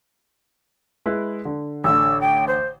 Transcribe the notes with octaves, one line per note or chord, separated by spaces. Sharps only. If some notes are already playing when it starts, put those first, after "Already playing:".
G#3 E4 B4
D3
A1 D3 E6
G5
C5